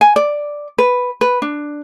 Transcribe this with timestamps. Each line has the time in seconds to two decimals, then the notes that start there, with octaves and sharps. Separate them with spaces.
0.01 G#5
0.16 D5
0.78 B4
1.21 B4
1.42 D4